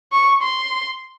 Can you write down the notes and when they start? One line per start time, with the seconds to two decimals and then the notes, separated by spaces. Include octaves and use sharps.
0.12 C#6
0.42 C6